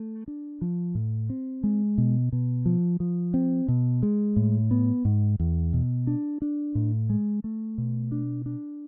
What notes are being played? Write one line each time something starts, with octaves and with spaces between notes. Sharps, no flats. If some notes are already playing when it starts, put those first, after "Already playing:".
Already playing: A3
D4
F3
A2
C4
G#3
B2
B2
F3
F3
C4
B2
G#3
A2
B3
G#2
E2
B2
D4
D4
A2
G#3
A3
B2
D4
D4